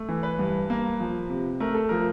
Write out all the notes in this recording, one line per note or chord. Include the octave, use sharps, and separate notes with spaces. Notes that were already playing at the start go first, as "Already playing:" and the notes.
Already playing: A3
E3
B4
G2
A#3
F3
C3
A3 A#4
A4
F3 A#4